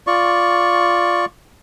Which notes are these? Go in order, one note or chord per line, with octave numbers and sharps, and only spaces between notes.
F4 D5 C#6